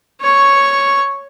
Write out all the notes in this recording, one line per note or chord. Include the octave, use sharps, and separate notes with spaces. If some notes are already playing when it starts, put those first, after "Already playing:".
C#5 C#6